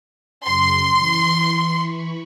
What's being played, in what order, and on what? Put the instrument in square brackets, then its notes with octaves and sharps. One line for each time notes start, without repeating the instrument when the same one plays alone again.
[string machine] F#2 C#3 [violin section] C6
[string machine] E3 B5 C#6